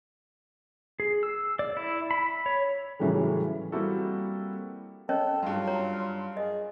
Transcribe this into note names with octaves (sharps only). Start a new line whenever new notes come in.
G#4
E6
D5
E4
B5
C#5
A2 C#3 E3 F#3 G3 A3
G3 A#3 C4 E4 F#4 A4
C#4 A4 C#5 D#5
G2 F#3 F4
C#5 A#5
G#4 D#5